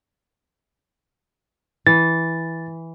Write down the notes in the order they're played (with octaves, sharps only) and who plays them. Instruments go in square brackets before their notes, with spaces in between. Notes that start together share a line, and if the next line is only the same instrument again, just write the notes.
[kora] E3 [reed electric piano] A6